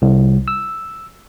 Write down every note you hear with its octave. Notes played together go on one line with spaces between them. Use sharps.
C2
E6